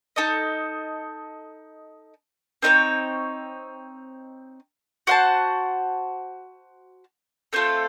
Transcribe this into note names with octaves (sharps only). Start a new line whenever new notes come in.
D#4 A4 D#5
C4 D#4 A#4 C#5
F#4 C5 F#5 A5
A3 C4 F4 A4